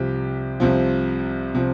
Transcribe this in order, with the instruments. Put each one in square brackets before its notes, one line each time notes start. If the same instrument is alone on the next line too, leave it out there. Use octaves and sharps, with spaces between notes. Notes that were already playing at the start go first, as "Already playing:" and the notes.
Already playing: [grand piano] C2 C3 F3 G4
C2 C3 F3
C3 F3